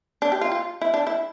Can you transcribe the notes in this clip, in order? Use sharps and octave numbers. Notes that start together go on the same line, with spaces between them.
D4
G4
F4
F4
E4
D4
E4